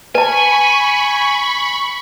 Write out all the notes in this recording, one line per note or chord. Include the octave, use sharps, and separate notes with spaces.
B4 G#5 A5 B5 C#6